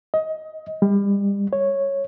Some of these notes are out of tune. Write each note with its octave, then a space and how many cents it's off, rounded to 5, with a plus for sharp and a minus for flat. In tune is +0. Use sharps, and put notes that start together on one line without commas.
D#5 +20
G3 +35
C#5 -5